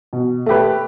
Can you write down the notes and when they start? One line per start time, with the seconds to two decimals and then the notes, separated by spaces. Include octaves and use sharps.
0.13 B2
0.46 A3 G4 B4